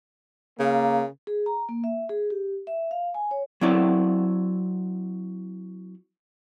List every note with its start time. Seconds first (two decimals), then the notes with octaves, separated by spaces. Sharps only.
0.60 C#3 A#3
1.27 G#4
1.46 A#5
1.69 A#3
1.84 E5
2.09 G#4
2.30 G4
2.67 E5
2.91 F5
3.14 G#5
3.31 C#5
3.61 F#3 C4 E4 D5